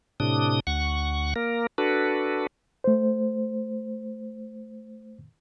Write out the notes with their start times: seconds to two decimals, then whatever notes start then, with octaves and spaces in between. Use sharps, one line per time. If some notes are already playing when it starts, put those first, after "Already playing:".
0.20 A2 C3 D4 D#6
0.67 D2 F#5 C#6
1.36 A#3 A#4
1.78 D4 F#4 A4 B4
2.84 A3 C5